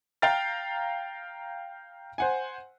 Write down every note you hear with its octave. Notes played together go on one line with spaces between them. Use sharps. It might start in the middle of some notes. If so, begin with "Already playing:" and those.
F5 G5 A#5 F6 A6
C5 F#5 G#5